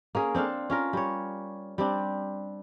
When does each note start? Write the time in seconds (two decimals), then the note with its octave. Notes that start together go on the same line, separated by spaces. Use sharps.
0.15 A#3 C#4 G#4
0.35 C4 D4 A4 F5
0.70 C#4 F4 A#4
0.93 G3 C#5
1.78 G3 C4 D4